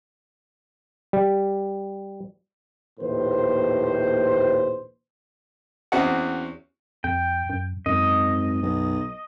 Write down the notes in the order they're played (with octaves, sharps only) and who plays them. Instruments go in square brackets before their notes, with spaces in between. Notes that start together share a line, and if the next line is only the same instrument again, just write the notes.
[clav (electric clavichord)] G3
[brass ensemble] A#1 D#2 A2 B4 C5
[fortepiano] E2 C4 C#4 F#4 F#5
[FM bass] F2 [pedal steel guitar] G5
[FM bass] F#2
[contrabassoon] G#1 [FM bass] F#2 [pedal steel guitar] D#5
[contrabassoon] B1